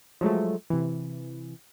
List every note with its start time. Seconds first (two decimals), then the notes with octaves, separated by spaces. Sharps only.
0.21 F3 F#3 G#3 A3
0.70 C3 E3